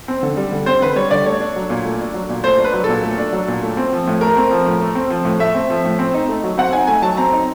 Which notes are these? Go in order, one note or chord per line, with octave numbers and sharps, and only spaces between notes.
C4
D3
G3
D3
C4 C5
D3 B4
G3 C#5
D3 D5
A3 C#5
D4
F#3
A#2
A3
D4
F#3
A#2
A3 C5
D4
B4
F#3
A#2 A4
A3
D4
F#3
A#2
A3
C4
F3
A2
A3 A#4
C4
F3
A2
A3
C4
F3
A2
A3 E5
C4
F3
A2
C4
D#4
A3
F#3
C4 F#5
D#4 G#5
A3 G#5
F#3 A5
C4 A#5
D#4